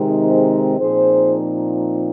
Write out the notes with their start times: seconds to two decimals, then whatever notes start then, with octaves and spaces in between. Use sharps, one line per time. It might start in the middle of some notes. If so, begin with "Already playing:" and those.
Already playing: C3 D#3 G#3 C4 D#4
0.30 G#4 C5
0.78 A#2 F3 C4 D#4 G#4 C5